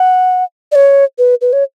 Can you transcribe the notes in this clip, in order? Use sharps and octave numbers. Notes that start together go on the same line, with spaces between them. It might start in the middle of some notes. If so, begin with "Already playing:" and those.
Already playing: F#5
D5
C#5
B4
B4
C#5